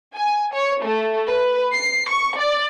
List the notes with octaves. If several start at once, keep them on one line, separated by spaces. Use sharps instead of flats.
G#5
C#5
A3
B4
C7
C#6
D5